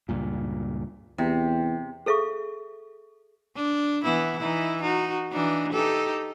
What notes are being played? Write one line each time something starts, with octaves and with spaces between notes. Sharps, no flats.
C#2 G2 A#2
E2 C3
G#4 A4 E5 F5 C#6
D4
E3 B3 E4
E3 D#4 E4
D#4 F#4
E3 D4 D#4
D#4 G4 A4